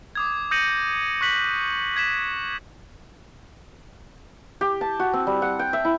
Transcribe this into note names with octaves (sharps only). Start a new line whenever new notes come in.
D6 D#6 G#6
D#6 G6 A#6 C#7 D#7 F#7
C#6 F#6 B6 F#7
G#6 B6 E7
G4
A5
F#4
C4
G3
F#5
G5
E5
E4